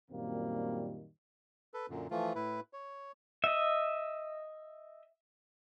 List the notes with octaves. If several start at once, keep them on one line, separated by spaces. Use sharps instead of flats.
F#2 A#2 D#3 G3 A#3 C4
A4 B4
F#2 A#2 D3
E3 F3 A3 F4
A2 E4 B4
C#5
D#5 E5